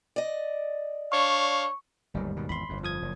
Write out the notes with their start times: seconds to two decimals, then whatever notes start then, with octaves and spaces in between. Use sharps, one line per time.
0.16 D5 D#5
1.12 D4 C#5 F5 C#6
2.14 G1 D#2 G#2 D#3 F#3 G3
2.36 B2 D#3
2.49 G#1 E2 B5 C6
2.69 G1 F2
2.83 F3 D#6 G#6
3.02 F#1 A#2